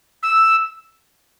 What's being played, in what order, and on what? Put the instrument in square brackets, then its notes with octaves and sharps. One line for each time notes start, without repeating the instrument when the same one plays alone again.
[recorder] E6